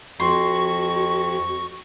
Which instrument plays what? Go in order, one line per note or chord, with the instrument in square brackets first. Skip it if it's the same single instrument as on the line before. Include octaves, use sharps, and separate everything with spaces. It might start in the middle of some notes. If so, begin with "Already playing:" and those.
[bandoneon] F2 [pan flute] F#4 [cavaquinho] C6 [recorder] C#6